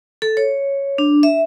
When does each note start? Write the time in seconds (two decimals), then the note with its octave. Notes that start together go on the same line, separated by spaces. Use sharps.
0.22 A4
0.37 C#5
0.98 D4
1.23 E5